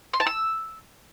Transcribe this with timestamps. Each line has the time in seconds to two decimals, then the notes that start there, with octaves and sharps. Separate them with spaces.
0.13 C6
0.20 A5
0.27 E6